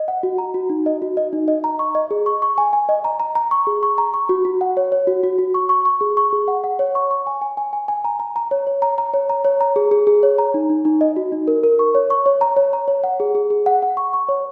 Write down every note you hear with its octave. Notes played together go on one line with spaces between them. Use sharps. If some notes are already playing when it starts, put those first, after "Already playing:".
Already playing: D#5
F#5
F#4
A#5
F#4
D#4
D#5
F#4
D#5
D#4
D#5
A#5
C#6
D#5
G#4
C#6
C#6
G#5
G#5
D#5
A#5
A#5
A#5
C#6
G#4
C#6
A#5
C#6
F#4
F#4
F#5
C#5
C#5
F#4
F#4
F#4
C#6
C#6
C#6
G#4
C#6
G#4
F#5
F#5
C#5
C#6
C#6
G#5
G#5
G#5
G#5
G#5
A#5
A#5
A#5
C#5
C#5
A#5
A#5
C#5
A#5
C#5
A#5
G#4
G#4
G#4
C#5
A#5
D#4
D#4
D#4
D#5
F#4
D#4
A#4
A#4
C#6
C#5
C#6
C#5
A#5
C#5
A#5
C#5
F#5
G#4
G#4
G#4
F#5
F#5
C#6
C#6
C#5